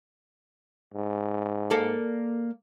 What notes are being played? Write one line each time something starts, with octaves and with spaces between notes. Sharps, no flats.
G#2
A#3 A4 D5